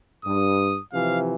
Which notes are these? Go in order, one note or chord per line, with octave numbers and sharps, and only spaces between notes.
G2 D#6
C3 E3 F3 F5